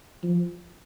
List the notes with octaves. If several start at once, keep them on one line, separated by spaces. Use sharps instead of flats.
F3